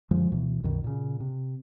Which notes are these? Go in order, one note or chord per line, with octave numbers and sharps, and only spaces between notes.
F#2 D3 F3 G#3
D2 B2 E3
C2 F#2 B2 D#3
A#2 C#3
C3